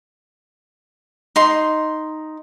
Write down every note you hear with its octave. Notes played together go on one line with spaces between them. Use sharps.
D#4 C6